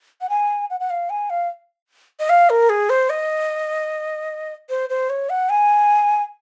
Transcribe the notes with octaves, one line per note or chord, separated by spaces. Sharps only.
F#5
G#5
F#5
F#5
F5
G#5
F5
D#5
F5
A#4
G#4
C5
D#5
C5
C5
C#5
F#5
G#5